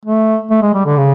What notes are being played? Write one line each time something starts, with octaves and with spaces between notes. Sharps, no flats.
A3
A3
G#3
G3
D3
C#3